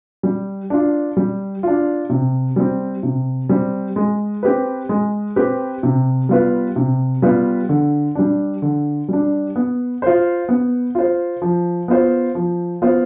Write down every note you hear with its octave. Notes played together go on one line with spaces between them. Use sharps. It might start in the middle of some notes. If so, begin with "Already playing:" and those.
G3
D4 F4
G3
D4 F4
C3
G3 C4
C3
G3 C4
G#3
C4 G4 B4
G#3
C4 G4 B4
C3
G3 B3 F4 B4
C3
G3 B3 F4 B4
D3
G3 D4
D3
G3 D4
B3
F4 C5
B3
F4 C5
F3
B3 F4 C5
F3
B3 F4 C5